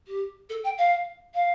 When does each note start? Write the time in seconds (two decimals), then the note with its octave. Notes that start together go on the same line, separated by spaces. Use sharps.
0.07 G4
0.49 A4
0.64 G5
0.78 F5
1.35 F5